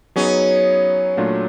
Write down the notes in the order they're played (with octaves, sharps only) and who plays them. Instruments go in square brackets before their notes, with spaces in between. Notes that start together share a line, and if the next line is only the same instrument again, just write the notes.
[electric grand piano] F#3 B3 D#4 G#4 [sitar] C#4
[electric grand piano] A#2 F#3 A3 D4 F4